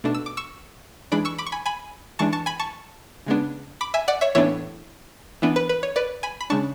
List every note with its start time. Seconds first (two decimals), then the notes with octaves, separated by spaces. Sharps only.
0.04 B2 A3 D4
0.14 E6
0.26 D6
0.37 C#6 E6
1.12 E3 G#3 D4 B5 D6
1.25 C#6 E6
1.38 B5 D6
1.46 C#6
1.52 G#5 B5
1.66 G#5 B5
2.19 E3 G#3 D4 A5 C#6
2.33 A5 C#6
2.46 G#5 B5
2.60 A5 C#6
3.26 C#3 G#3 B3 D4
3.81 B5 D6
3.94 E5 G#5
4.08 D5 F#5
4.21 C#5 E5
4.35 A2 E3 B3 D4 C#5 E5
5.42 E3 B3 D4
5.56 B4
5.69 B4
5.83 C#5
5.96 B4 D5
6.23 G#5 B5
6.41 B5
6.50 C#3 G#3 D4 A5 C#6